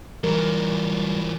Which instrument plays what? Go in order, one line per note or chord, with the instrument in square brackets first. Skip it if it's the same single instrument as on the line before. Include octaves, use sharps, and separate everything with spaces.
[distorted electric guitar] E3 F#3 [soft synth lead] G3 [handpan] A#4